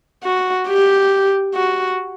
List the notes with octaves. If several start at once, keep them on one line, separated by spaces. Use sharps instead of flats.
F#4
G4
F#4